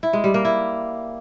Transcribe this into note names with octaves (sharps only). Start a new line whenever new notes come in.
E4
G#3
G3
A#3
E4